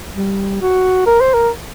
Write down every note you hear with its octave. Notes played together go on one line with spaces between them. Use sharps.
G3
F#4
A#4
C5
A#4